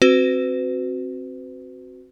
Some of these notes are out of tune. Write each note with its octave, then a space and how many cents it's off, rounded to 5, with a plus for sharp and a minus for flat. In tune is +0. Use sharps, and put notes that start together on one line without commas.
C4 +15 F#4 +0 B4 +40